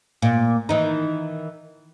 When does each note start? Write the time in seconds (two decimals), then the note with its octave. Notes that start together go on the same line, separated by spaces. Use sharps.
0.22 A#2
0.69 D#3 E3 D#4